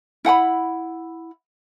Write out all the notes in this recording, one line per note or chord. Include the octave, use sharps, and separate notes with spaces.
E4 F#5 G5 B5